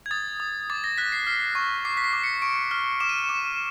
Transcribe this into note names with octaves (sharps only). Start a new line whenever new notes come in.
G#6
D#6 A6
D#6
D6 A6
A#6
F#6 B6
C7
F6 C7
C#6
D6 C7
B6
C7
D6
C#7
C#6 D7
F6
D6 E7
D#7
E7
D6